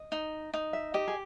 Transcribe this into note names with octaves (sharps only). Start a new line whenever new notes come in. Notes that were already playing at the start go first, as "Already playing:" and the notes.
Already playing: D#5
D#4
D#4
E5
G4 D#5
G#4